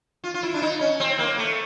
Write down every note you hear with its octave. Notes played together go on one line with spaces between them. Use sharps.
F4
F4
E4
D4
D#4
C#4
C4
A#3
A3